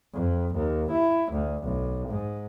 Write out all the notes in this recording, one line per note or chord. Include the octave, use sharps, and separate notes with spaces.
F2
D#2
E4
D2
B1
G#2